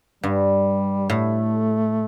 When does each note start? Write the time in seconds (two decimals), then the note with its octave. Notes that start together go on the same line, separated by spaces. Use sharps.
0.23 G2 G3
1.10 A2 A3